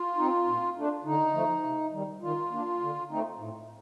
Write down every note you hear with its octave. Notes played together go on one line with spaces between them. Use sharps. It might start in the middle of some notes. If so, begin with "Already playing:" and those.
Already playing: F4
C4 D#4
A#2
A3 D4
D3 D#4
F3 A3
C3
D#3 G3
D#3 F4
A#3 D4
D3
A3 C4 D#4
A2